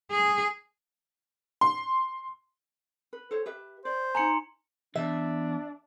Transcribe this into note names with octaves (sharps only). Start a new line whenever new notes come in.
G#4
C6
B4
A4 C5 C#5
G4 B4 E5
C5 D5
D#4 G#5 A#5 C6 C#7
E2 D4 E5